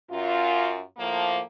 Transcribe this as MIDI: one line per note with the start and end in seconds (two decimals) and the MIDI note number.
0.10 0.81 42
0.10 0.81 65
0.97 1.39 45
0.97 1.39 53
0.97 1.39 58